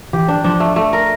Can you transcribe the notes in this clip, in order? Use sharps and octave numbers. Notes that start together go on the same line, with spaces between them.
E3 G4
D4
F3 D4
A3
A3
A#4